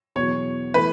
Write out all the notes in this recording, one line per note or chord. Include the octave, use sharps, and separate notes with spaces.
E2 B2 F#3 C#5
E3 A3 E4 A4 B4